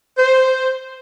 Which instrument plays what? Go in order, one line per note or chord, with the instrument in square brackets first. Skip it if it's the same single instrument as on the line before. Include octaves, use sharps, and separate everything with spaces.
[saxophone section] C5